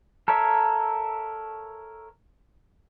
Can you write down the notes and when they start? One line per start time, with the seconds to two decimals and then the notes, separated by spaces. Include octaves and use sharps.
0.28 A4 A#4 C#5 E5